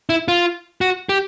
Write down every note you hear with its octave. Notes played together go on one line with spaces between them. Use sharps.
E4
F4
F#4
G4